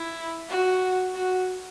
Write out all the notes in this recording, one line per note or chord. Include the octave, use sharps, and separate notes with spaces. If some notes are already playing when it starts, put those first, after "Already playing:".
Already playing: E4
F#4
F#4